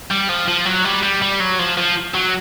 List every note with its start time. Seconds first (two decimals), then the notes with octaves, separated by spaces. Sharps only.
0.11 G3
0.29 F3
0.48 F3
0.66 F#3
0.85 G3
1.03 G3
1.22 G3
1.40 F#3
1.59 F3
1.77 F3
2.14 F#3